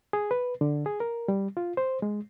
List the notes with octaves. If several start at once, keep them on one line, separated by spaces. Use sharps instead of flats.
G#4
B4
D3
G#4
A#4
G3
F4
C5
G#3